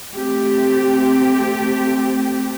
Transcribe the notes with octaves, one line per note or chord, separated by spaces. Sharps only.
A3 C4 G4